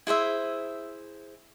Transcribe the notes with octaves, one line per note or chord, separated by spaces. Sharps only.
E4 G#4 C5 E5